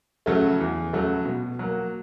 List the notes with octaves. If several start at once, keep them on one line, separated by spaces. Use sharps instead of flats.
C#3 F#3 A3
E2
C#3 F#3 A3
B2
F#3 A#3